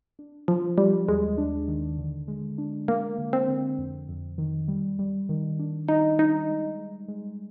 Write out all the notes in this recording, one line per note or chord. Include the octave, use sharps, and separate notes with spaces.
D4
F3 F4
G3 F4
D#2 G#3
D4
D#3
D3
G#3
D4
G#3 A#3
D3
C4
D3
F2
F2
D#3
G3
G3
D#3
D4
G3 D#4
G3 D#4
G#3
G#3
G#3